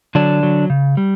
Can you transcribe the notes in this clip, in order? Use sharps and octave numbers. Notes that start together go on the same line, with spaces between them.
D3 F#3 D4
F#3
C#3
G3